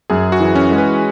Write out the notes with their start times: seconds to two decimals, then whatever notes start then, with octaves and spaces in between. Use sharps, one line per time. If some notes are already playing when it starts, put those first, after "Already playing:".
0.10 F#2 G#4
0.32 F#4
0.40 E3
0.55 C#4
0.71 G#3
0.78 B4